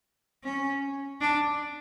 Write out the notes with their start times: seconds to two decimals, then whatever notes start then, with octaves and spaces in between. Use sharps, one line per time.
0.44 C#4
1.21 D4